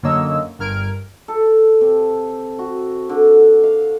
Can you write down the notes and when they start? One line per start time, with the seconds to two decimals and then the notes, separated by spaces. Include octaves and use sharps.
0.03 F#2 D3 A#3 C#5 D#5 E6
0.59 G1 G2 A#4 F6 G#6 D7
1.28 A4
1.81 C3
2.59 F#4
3.09 D3
3.64 F5